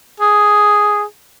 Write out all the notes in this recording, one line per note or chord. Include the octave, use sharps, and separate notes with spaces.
G#4